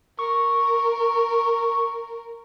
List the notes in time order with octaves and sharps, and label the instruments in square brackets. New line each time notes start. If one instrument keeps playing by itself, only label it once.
[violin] A#4 [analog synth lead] C#6